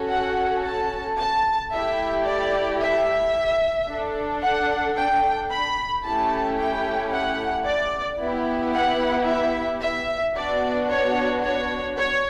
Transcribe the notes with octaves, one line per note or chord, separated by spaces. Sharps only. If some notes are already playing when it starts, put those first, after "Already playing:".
Already playing: C#4 F#4 A4
F#5
A5
A5
A3 E4 G4 E5
D5
E5
D4 A4
F#5
G5
B5
A3 C#4 E4 G4 A5
G5
F#5
D5
B3 E4 G4
F#5
E5
E5
B3 D4 F#4 D5
C#5
C#5
C#5